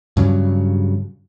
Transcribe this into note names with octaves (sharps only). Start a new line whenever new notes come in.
G2 C#3 F#3